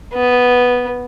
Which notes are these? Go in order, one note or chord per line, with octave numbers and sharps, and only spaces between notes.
B3